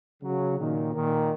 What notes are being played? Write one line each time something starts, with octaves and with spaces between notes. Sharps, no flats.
C#3 F#3
A#2 D#3
A#2 D#3